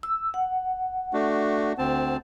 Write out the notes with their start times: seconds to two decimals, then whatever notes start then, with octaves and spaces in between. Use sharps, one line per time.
0.03 E6
0.34 F#5
1.13 A3 D4 F#4
1.78 D2 C4 A5